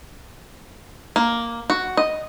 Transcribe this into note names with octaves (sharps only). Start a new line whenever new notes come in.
A#3
F#4
D#5